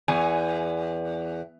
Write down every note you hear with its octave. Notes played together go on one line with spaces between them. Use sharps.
E2 G#5